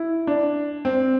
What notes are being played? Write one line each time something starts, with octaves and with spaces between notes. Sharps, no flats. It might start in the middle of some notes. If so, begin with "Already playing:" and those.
Already playing: E4
D4
C4